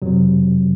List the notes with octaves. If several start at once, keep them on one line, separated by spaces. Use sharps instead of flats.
F2 C3 F#3